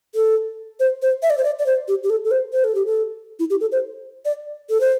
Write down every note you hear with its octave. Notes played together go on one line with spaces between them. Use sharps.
A4
C5
C5
E5
D5
C5
D5
D5
C5
G4
G4
A4
A4
C5
C5
A4
G4
A4
E4
G4
A4
C5
D5
A4
C5